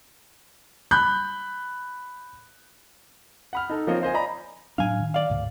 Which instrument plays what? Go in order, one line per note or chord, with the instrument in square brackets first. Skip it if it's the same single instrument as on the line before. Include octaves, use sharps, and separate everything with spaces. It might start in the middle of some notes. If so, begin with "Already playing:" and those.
[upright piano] B5 F#6 G6
[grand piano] F#5 B5 F6
D#4 A4
F3 A#3 C4 F4 C#5 D#5
F4 C5 D#5 G#5
D5 D#5 A#5 B5
[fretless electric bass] A2 F#3 D4 [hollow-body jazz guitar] F5 G#5
[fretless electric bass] D#3
[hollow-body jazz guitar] D5 F5
[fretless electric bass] D2 G#2 D3